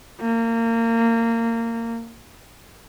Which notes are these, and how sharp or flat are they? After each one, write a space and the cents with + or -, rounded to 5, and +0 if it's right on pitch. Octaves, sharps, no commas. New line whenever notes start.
A#3 -25